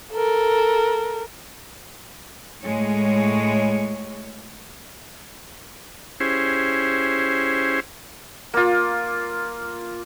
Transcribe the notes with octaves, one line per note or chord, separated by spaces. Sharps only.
A4 A#4
A2 G#3 C#5
C#4 E4 G4 G#4 C5
A#3 F4